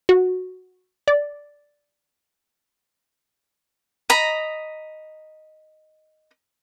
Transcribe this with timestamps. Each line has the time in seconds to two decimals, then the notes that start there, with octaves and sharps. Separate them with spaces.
0.09 F#4
1.08 D5
4.10 D#5 A#5 B5